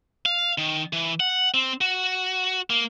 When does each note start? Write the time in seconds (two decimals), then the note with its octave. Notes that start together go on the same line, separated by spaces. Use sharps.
0.26 F5
0.58 D#3
0.93 E3
1.20 F#5
1.54 C4
1.81 F#4
2.70 A#3